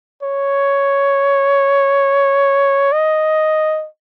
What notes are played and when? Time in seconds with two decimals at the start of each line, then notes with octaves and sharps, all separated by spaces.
0.23 C#5
2.92 D#5